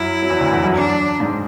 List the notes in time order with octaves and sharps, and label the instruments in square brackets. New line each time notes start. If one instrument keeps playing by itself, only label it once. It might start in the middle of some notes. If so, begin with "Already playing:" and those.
Already playing: [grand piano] F#2 F#3 [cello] E4
[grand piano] F#3
E2 E3
D2 D3
E2 E3
F#2 F#3
[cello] D4
[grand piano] G#2 G#3